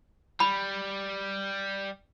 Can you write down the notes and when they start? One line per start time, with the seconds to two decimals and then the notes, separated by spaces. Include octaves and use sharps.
0.40 G3 B5